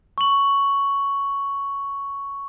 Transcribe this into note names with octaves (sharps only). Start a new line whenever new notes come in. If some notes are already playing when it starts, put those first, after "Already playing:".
C#6 F#7